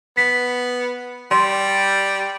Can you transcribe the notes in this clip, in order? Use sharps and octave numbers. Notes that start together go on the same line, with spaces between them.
B3 B6
G3 D5 C6